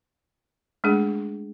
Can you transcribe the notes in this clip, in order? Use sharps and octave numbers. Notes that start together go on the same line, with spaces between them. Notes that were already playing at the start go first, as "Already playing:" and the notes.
G#3 A3 D4 G#4